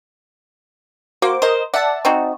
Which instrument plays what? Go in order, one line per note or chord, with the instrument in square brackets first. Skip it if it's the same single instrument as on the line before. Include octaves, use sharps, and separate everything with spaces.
[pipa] A#3 [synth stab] F#4 C5 D6
[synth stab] A#4 D#5 [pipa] C5
[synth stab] D5 E5 A5 [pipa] F#5
[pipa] C4 D#4 F#4